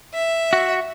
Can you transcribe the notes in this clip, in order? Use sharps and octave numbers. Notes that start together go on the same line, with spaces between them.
E5
F#4